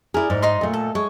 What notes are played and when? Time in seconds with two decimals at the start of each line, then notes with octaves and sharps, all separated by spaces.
0.14 E4 G#4 A#4 D5
0.30 G#2
0.42 D#4 D#5 C6
0.61 A#2 A3
0.74 A4
0.95 G#3 C#5